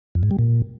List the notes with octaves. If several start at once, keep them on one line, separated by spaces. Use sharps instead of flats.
F2
G#2
G3
A#2